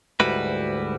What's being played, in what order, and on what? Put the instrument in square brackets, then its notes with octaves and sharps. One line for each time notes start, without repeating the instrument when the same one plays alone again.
[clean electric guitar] D2 G#2 G3 E4 F#4 B4